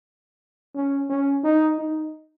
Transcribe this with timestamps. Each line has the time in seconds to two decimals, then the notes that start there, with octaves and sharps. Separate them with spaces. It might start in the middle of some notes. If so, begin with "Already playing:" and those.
0.75 C#4
1.10 C#4
1.44 D#4
1.78 D#4